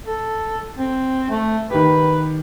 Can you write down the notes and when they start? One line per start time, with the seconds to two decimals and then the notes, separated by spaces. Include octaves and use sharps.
0.06 A4
0.78 C4
1.30 A3
1.70 D#3 G4 B4